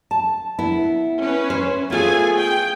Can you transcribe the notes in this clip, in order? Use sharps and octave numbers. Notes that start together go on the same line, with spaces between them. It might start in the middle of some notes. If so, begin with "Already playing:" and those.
A5
B3 E4
C#4 B4
C5
A3 B3 F4 G#4 G#5
G5